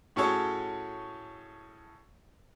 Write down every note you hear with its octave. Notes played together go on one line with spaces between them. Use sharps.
A2 C#4 F#4 G#4 A4 C#5